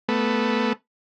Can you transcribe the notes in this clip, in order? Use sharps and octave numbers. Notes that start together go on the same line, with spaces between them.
A3 B3